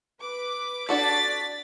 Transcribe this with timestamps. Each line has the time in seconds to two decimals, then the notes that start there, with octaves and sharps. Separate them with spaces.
0.20 B4 D6
0.89 D4 F#4 A4 D5 A6 B6